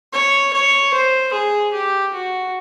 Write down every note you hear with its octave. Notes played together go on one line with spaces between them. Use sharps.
C#5
C#5
C5
G#4
G4
F#4